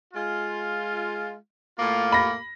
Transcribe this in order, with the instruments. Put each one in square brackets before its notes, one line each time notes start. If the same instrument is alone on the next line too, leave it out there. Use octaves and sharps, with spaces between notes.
[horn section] G#3 F4
A2 A#3 F4
[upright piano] B5 A#6